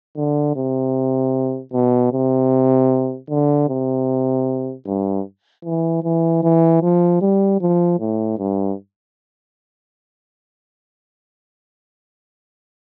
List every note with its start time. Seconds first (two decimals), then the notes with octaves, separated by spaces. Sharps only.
0.16 D3
0.56 C3
1.73 B2
2.12 C3
3.30 D3
3.69 C3
4.86 G2
5.65 E3
6.03 E3
6.43 E3
6.82 F3
7.21 G3
7.60 F3
8.00 A2
8.38 G2